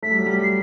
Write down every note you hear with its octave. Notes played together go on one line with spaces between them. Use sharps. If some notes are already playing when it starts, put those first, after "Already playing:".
A3 B6
G3
F#3
G3
C7